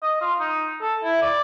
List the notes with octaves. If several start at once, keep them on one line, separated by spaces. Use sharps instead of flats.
D#5
F4
D#4
A4
E4
D5